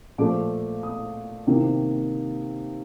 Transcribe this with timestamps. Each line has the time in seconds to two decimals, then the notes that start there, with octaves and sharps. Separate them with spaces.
0.18 A#2 F3 A3 D6
0.83 D#6
1.47 C3 D#3 A#3